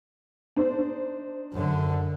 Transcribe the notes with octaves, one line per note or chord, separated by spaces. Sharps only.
D4 D#4 C5
F#2 D3